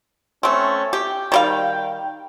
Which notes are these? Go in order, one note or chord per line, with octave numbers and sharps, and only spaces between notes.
A3 C4 C#4
G4 G5
D#3 G3 F5